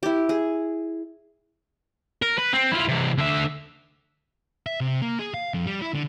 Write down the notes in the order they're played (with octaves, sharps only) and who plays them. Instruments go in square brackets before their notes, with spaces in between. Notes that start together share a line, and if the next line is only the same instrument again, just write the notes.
[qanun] E4 G4
G#4
[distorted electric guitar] A#4
B4
C4
E4 F4
C3 E3
D3 E5
E5
C3
A#3
G#4
F5
F2
G3
E4
D3